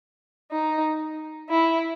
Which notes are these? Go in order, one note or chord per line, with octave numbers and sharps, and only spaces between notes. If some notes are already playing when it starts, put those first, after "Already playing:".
D#4
E4